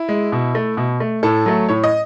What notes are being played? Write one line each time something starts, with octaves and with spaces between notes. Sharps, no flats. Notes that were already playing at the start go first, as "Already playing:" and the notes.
Already playing: E4
G#3
B2
A3
B2
A3
A2 A4
F#3 A3
A2 C#5
D#5